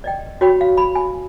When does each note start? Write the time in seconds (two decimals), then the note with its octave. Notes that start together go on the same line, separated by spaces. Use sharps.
0.04 D5 D#5 G5
0.41 F#4 C#5 G5 B5 C6
0.61 F5
0.77 B5
0.95 G#5